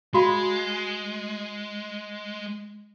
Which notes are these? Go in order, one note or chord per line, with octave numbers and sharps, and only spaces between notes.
G#3 F#4 F5 B5